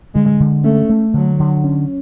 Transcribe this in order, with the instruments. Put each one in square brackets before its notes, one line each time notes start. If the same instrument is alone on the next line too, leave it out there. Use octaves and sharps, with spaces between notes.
[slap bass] D3 [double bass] G#3
[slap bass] D3
[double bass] A3 [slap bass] C#4
[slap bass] A3
[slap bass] D3 [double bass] F#3
[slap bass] D3
C#4